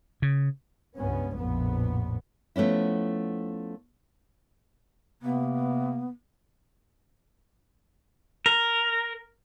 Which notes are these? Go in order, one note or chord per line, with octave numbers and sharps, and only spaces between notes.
C#3
C#2 G2 B3 C#4
A#1 F2 A2 B3
F3 A3 B3 C#4 E4
C3 A#3 B3
A#4